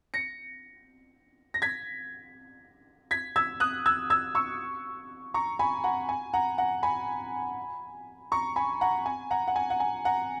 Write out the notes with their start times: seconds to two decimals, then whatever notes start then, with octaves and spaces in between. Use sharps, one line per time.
0.14 A#6 C#7
1.54 A#6
1.62 G#6 B6
3.11 G#6 B6
3.36 E6 G#6
3.60 D#6 F#6
3.86 E6 G#6
4.10 E6 G#6
4.35 C#6 E6
5.34 A#5 C#6
5.59 G#5 B5
5.84 F#5 A#5
6.09 G#5
6.33 F#5 A#5
6.58 F#5 A#5
6.83 G#5 B5
8.32 A#5 C#6
8.56 G#5 B5
8.81 F#5 A#5
9.06 G#5
9.31 F#5 A#5
9.47 F#5
9.56 G#5
9.70 F#5
9.80 G#5
10.05 F#5 A#5